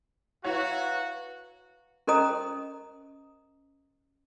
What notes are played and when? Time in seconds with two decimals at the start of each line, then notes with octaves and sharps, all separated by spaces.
0.45 E4 F#4 B4 C#5 F5 A#5
2.07 C#4 A#4 C5 D#5 A#5 D#6